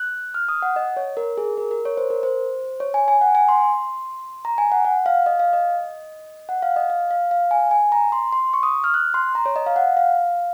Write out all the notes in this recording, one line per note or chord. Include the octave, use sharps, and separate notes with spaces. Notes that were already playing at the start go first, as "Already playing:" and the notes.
Already playing: F#6
F6
D#6
F#5
D#5
C#5
A#4
G#4
A#4
A#4
C#5
C5
A#4
C5
C#5
G#5
G#5
F#5
G#5
C6
A#5
G#5
F#5
F#5
F5
D#5
F5
D#5
F#5
F5
D#5
F5
F5
F5
G#5
G#5
A#5
C6
C6
C#6
D#6
F6
F#6
C6
A#5
C#5
D#5
F5
F#5
F5